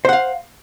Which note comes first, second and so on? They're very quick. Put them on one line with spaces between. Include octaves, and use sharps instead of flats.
C5 F#5 F5